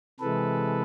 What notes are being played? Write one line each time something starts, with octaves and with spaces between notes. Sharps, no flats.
C3 E3 G#3 A4 B4